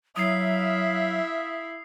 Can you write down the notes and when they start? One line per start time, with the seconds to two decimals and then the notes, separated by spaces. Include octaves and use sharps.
0.16 F#3 E4 E5 F5 D#6 C7